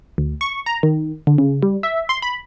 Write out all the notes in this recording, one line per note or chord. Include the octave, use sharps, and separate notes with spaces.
D2
C#6
A#5
D#3
D3
C#3
G3
E5
C6
B5